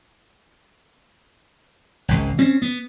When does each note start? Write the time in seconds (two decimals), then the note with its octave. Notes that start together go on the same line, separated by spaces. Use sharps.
2.08 G#1 C#2
2.39 C4 C#4
2.62 B3